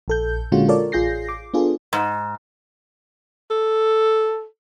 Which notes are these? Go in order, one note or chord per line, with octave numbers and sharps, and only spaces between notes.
A#1 A4 G6
A#2 D3 G#3 C#4 F4 F#4
F4 A4 A#4 C#5 D5
A1 F4 G#4 G6 A#6 C7
D6
B3 D4 F4 G#4 A4
G#2
A4